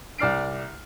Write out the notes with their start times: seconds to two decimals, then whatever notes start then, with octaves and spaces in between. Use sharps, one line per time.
0.18 C2 D5 F6 C7 D7